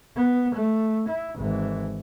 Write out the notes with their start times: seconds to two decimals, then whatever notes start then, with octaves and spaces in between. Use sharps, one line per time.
0.17 B3
0.55 A3
1.09 E4
1.37 G#1 E3